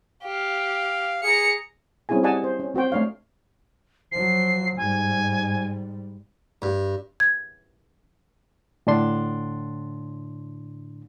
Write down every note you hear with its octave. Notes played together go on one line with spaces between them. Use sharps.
G4 F5
G#4 A#5 C#7
G3 C4 C#4 E4 G#4 G#5
G4 D5 D#5 F#5 G#5 A5
C5
C#4
C4 F#4 C5 G5
A3 D4 C#5 F5
F3 F#3 C7
G#2 G3 G#5
G2
G#6
A2 D3 D4 C6